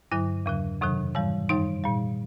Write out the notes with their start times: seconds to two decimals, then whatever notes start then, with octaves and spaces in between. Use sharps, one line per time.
0.11 G2 D3 F#3 E4
0.46 E2 C#3 F#3
0.81 F2 C3 D#3 F#3
1.15 G#2 E3 G3
1.49 F#2 D#3 G3 D#4
1.84 A#2 G3